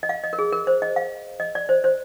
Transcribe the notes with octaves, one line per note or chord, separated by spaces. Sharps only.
D#5
F5
D#5
A#4
G#4
A#4
C5
D#5
F5
D#5
D5
C5
C5